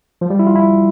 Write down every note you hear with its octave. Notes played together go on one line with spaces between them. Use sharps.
F3
G3
E4
F4
E4